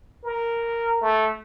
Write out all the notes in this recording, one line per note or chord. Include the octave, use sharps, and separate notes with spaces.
A#4
A3